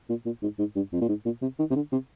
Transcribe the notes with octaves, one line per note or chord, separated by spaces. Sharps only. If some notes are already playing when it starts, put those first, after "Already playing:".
A#2
A#2
G#2
G#2
G2
F2
A#2
G#2
A#2
C3
D#3
C3
D3
C3